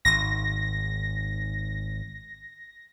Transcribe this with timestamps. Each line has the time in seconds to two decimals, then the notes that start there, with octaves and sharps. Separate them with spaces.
0.05 G#1 A#6